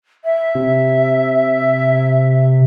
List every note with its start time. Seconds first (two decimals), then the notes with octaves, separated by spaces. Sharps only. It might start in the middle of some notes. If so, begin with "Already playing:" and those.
0.25 E5
0.55 C3